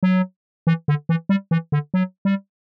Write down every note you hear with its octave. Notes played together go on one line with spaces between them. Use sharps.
F#3
E3
D3
E3
G3
E3
D3
F#3
G3